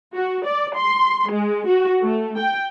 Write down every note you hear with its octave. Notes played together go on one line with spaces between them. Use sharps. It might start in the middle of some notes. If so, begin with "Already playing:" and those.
F#4
D5
C6
G#3
F#4
A3
G5